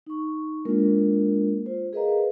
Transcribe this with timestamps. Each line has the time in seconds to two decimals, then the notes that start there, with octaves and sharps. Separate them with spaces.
0.07 D#4 C#6
0.65 G#3 A#3 D4 F4 A#4
1.66 F4 C5
1.93 G#4 A#4 B4 D#5 F5 A#5